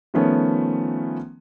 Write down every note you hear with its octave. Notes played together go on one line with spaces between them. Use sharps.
D#3 F3 A3 B3 C#4